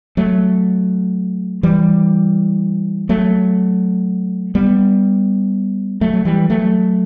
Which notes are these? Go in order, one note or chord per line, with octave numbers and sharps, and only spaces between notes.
F#3 A3
E3 G3
F#3 A3
G3 B3
F#3 A3
F#3
E3 G3
F#3 A3